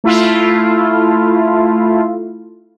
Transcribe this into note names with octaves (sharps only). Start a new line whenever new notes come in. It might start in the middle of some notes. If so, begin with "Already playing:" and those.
A3 E4 F4